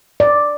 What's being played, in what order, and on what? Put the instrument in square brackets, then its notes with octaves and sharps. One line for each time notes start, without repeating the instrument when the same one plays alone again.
[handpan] D5